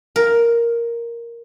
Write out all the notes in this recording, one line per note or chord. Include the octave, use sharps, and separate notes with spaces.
A#4